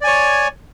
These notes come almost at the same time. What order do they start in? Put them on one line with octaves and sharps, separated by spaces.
D5 G#5 C#5